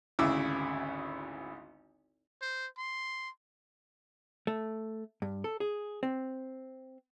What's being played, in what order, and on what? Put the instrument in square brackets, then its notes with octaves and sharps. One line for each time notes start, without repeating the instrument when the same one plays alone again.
[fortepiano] G#1 D2 C#3 E4 D6 E6
[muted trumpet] C5
C6
[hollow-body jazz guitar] A3
G2
A4
G#4
C4